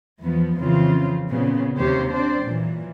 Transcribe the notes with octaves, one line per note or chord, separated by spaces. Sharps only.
E2 F3 B3
F2 C#3 E3 C4 F4
A#2 C#3 B3 C4
D#2 C3 A#3 G4 C5 C#5
C4 D4 C5 D5
A#2 E3 F#3